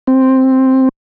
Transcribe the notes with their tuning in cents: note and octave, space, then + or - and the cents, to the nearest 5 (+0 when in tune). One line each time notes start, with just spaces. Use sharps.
C4 +5